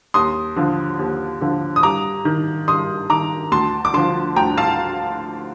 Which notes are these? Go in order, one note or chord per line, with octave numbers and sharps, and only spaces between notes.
D#2 C6 D#6
D3 F3
D#2
D3 F3
D#6
G2 A#5 D6
D#3
G2 C6 D#6
D#3 A#5 D6
D2 A5 C6
D6
D3 F3 A5 C6
D2 G5 A#5
F5 A5